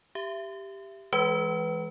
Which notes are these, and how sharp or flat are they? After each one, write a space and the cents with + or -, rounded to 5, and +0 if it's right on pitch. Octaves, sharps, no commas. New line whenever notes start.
G4 +0 E5 +25
E3 +0 G#3 +0 B4 +5